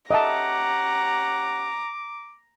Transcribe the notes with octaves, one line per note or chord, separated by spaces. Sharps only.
C#4 G4 D#5 E5 F#5 A5 A#5 D6